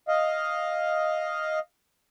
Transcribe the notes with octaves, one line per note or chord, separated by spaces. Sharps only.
D#5 F5